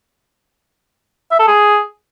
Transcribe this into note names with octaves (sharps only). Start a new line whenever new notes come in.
E5
A4
G#4